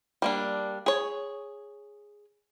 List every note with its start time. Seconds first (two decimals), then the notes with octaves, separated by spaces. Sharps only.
0.22 G3 A#3 D4
0.86 G#4 C#5